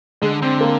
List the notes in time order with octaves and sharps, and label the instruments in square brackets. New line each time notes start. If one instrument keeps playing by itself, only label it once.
[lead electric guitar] D3 [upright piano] G#3
[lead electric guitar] D3 [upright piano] C4
[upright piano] A#3